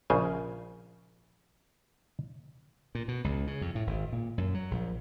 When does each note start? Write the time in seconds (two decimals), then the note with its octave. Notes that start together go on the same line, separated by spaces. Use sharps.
0.10 A#1 C#3 C5 G#5
2.95 A#2
3.08 B2
3.24 C#2
3.47 C#3
3.61 F2
3.75 A2
3.87 G#1
4.12 A#2
4.38 F#2
4.54 F#3
4.71 A#1